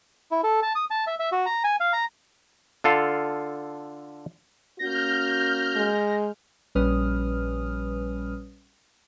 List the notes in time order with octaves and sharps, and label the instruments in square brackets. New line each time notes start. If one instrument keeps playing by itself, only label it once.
[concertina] E4
A4
A5
D#6
A5
E5
E5
F#4
A#5
G#5
F5
A#5
[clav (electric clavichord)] D3 F4 A4 F5
[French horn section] A#3 C#4 F#4 [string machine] F6 G6 [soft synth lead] A#6
[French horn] G#3
[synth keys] A#1 G3 C#4 B4 D#6 F6